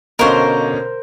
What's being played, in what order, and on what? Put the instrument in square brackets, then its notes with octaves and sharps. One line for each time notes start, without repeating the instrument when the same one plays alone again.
[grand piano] B2 D3 C#4 [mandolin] A#4 C5 [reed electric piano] D#5 F5 C#6